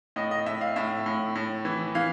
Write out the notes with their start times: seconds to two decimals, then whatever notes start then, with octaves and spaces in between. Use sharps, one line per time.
0.16 A2 D#5
0.31 D#5
0.46 A2 E5
0.61 F5
0.76 A2 E5
1.06 A2
1.35 A2
1.65 E3
1.95 E3 F5